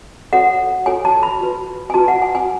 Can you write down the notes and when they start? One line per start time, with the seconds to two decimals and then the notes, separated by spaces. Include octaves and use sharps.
0.33 F#4 A4 C#5 F#5
0.86 F#4 A4 C#5 G#5
1.05 A5
1.23 B5
1.41 F#4 B4
1.90 G#5
1.94 F#4 B4 A5
2.08 F#5
2.22 G#5
2.35 G#5